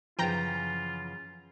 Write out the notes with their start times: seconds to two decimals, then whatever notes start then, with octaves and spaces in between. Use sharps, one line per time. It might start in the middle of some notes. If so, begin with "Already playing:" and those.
0.19 F#2 C#3 E3 F3 F4 G5 A#5